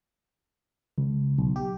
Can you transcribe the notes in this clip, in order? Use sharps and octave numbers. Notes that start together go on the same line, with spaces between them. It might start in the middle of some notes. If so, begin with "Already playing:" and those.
C#2
B1
G4